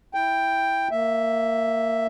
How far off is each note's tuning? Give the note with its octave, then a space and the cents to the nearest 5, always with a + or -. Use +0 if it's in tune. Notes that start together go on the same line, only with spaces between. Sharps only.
E4 +0 G5 +5
A#3 -20 E5 +0